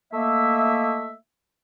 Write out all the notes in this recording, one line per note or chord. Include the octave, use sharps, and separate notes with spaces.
A3 A#3 D#5 E5